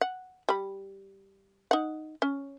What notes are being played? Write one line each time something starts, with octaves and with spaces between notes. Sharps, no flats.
F#5
G3 B5
D#4 F#5
C#4